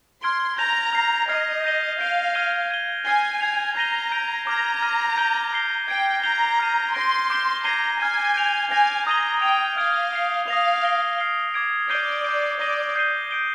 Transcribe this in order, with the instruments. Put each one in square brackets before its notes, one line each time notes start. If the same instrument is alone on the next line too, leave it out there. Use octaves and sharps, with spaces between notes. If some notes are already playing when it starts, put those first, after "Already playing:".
[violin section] C6 [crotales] F6 G#6 D7 G7
[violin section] A#5 [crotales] G6 A#6 F7
[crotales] F6 C7 F7
[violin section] D#5 [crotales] F6 G#6 C7
[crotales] G6 A#6 D#7 G7
[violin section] F5 [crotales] G6 D7 G7
[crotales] F6 G#6 D#7 G7
G#6 D#7 G7
[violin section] G#5 [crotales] F6 G#6 C7 G7
[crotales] G#6 C7 F7
[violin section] A#5 [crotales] G6 A#6 D#7 G7
[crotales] G6 D7 F7
[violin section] A#5 [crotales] D6 F6 G#6
[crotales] F6 A#6 D#7
G6 D7 G7
F6 C7 G7
[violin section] G5 [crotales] G#6 D7 G7
[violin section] A#5 [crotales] G6 C7 G7
[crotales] F6 C7 D#7
[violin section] C6 [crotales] G6 A#6 D7 G7
[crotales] D6 G6 D7 G7
[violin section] A#5 [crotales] G#6 C7 D#7 G7
[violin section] G#5 [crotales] F6 G#6 D#7
[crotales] G6 D7 F7
[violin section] G#5 [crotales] G6 A#6 F7
[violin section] A#5 [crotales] D#6 G#6 D#7 G7
[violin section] G5 [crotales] G#6 D7 F7
[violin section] F5 [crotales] F6 G#6 D7
[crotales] F6 C7 G7
[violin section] F5 [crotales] D#6 A#6 F7
[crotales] F6 A#6 D7 G7
F6 C7 G7
D6 G#6 D7
[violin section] D5 [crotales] G6 C7 D#7 G7
[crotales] D6 G6 D7
[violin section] D5 [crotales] D#6 A#6 D#7 G7
[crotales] G6 C7 D#7 G7
G6 D7 G7